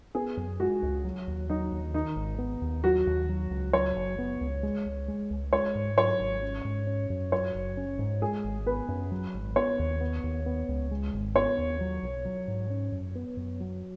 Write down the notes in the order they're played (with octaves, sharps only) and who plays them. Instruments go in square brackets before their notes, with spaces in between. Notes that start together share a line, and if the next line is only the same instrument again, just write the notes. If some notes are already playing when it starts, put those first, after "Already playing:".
[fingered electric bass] B3 [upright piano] G#4
[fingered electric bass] F#2
[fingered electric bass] G#3 [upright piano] F#4
[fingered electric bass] C#2
F#3
D#2
[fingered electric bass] F#3 [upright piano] D#4
[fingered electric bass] D#2
[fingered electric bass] D#3 [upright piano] D#4
[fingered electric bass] G#1
B3
D#2
[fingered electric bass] F#3 [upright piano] F#4
[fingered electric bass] D#2
F#3
C#2
[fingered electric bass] F#3 [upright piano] C#5
[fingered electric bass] F#1
B3
C#2
G#3
C#2
G#3
C#2
[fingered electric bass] G#3 [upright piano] C#5
[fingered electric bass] G#2
[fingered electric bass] F#3 [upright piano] C#5
[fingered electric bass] G#1
C#4
G#2
C#4
F#2
[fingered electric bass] F#3 [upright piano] C#5
[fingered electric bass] F#1
C#4
G#2
[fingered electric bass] G#3 [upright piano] G#4
[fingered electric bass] G#1
[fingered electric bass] B3 [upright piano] B4
[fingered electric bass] F#2
F#3
G#1
[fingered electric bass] B3 [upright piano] C#5
[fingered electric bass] D#2
B3
D#2
B3
C#2
G#3
G#1
[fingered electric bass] B3 [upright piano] C#5
[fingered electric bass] D#2
F#3
B1
F#3
G#2
C#4
F#2
B3
F#2
F#3